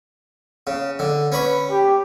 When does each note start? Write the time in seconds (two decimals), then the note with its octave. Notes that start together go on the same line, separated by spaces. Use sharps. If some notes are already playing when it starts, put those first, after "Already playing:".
0.67 C#3
0.99 D3
1.32 C#4 B4 B5 C#6
1.70 G4